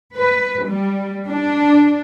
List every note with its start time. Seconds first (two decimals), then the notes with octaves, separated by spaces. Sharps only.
0.15 B4
0.65 G3
1.29 D4